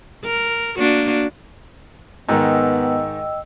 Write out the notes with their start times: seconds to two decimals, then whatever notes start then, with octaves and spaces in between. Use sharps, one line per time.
0.25 A#4
0.77 A#3 D4 F#4
2.29 G#2 D#3 B3 D#5 G5 E6